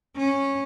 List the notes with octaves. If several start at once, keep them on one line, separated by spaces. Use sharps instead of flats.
C#4